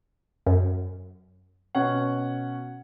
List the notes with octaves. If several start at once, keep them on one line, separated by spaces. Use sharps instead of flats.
F#2
B2 C#4 F#5